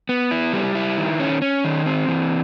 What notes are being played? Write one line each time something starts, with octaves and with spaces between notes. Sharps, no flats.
B3
E4
G3
E4
D#3
C#4
C#4
D#3
C4
E3